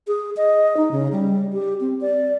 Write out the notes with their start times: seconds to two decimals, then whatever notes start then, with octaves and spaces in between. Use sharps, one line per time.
0.07 G#4
0.37 D#5
0.77 D#4
0.91 C#3
1.12 G3
1.53 G4
1.81 C4
2.01 D5